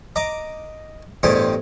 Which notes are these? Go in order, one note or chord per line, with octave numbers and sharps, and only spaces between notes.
D#5 A#5 D6
A1 E2 G2 G4 C5 D#5